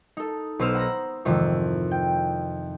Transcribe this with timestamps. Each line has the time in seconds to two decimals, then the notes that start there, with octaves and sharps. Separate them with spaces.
0.17 D#4 A4
0.59 B1 B4 C5 E6 F6
0.74 F#5 A#5 A#6
1.25 F2 G#2 C3 D#3 E3
1.91 G5